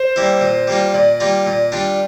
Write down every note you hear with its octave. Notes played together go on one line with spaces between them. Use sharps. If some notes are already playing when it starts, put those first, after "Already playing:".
Already playing: C5
G3 A#3 E4
A#2
G3 A#3 F4
A#2 D5
G3 A#3 F4
A#2
G3 D4 F4